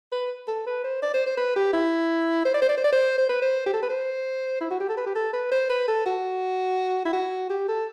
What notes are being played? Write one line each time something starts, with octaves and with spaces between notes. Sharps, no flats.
B4
A4
B4
C5
D5
C5
C5
B4
G4
E4
C5
D5
C5
D5
C5
D5
C5
C5
B4
C5
G4
A4
B4
C5
E4
F#4
G4
A4
B4
G4
A4
B4
C5
B4
A4
F#4
E4
F#4
G4
A4